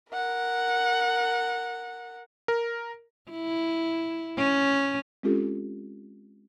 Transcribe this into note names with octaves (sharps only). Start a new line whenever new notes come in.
A#4 F#5
A#4
E4
C#4
G#3 C4 C#4 F4 G4 A4